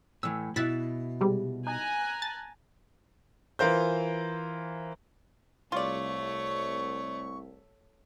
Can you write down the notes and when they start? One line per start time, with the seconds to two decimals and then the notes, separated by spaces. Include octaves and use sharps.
0.23 A2 E3 E6
0.56 B2 E4 E5 F#6 A6 B6
1.21 C3 G3 G#3
1.67 D#4 G#5 A#5 F#6
2.22 A5 A6
3.59 E3 F4 A#4 C5 G6
5.72 C2 A3 F4 C#5 D5 C#6